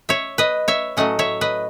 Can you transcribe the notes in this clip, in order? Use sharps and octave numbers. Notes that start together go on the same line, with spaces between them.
C#5 E5
B4 D#5
C#5 E5
A2 F#3 A3 C#4 D#5 F#5
C#5 E5
B4 D#5